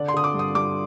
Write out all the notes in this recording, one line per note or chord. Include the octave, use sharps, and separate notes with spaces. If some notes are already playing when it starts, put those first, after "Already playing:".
Already playing: D3 D5
C6
D3 D#6
D6
G2
D#6
G2 D6